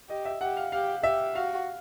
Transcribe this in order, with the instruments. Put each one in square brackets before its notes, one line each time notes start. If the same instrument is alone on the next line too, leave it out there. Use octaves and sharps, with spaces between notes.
[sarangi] G4 [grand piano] D#5
[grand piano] E5
[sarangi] G4 [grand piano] F#5
[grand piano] F5
[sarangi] G4 [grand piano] F5
[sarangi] G4 [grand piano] E5
[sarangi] F#4 [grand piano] F5